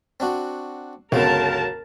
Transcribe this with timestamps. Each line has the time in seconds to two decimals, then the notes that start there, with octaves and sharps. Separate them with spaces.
0.20 C4 D4 F#4
1.12 G1 C#2 F#3 F4 A#4 A5